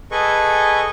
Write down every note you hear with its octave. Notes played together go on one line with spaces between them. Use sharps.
G#4 A4 B4 D#5 C#6